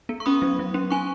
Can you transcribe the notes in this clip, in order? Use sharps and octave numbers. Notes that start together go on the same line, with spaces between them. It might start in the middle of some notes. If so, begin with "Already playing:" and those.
B3
C#6
C#4 B5 D#6
F#3
F#3
C#4
C#4 G#5 C#6